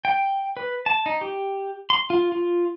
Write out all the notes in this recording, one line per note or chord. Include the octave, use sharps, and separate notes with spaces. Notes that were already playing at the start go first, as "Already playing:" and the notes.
G5
B4
A5
D#4
G4
C6
F4
F4